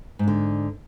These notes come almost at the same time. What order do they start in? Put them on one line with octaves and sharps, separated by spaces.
G#2 D4 D3